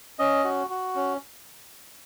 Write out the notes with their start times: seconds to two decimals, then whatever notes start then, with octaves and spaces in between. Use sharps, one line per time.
0.19 C#4 D#5
0.44 F#4
0.70 F#4
0.96 C#4